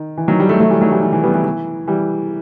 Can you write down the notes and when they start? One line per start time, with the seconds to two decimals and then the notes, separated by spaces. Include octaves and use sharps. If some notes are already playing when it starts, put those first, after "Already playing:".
Already playing: D#3
0.17 E3
0.28 D#3 F#3
0.40 G3
0.49 F#3 A3
0.60 F#3 A3
0.70 E3 G3
0.81 D#3 F#3
0.92 E3 G3
1.03 E3
1.13 E3
1.23 G3 B3
1.34 E3
1.44 E3
1.87 E3 G3